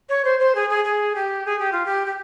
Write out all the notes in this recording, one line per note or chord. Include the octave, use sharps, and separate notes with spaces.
C#5
C5
C5
G#4
G#4
G#4
G4
G#4
G4
F4
G4
G4